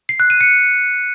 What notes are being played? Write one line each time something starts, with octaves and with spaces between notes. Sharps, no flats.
C7
F#6
D#7
C#7